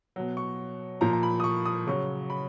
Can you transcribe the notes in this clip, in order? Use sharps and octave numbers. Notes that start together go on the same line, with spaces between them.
B2 F#3
C#6
A#2 F3 A#5
A#5
B5
D#6
C#6
D#6
C#3 F#3 C#6
B5